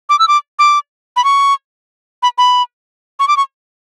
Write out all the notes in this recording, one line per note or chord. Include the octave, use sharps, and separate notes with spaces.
D6
E6
D6
D6
B5
C#6
B5
B5
C#6
D6
C#6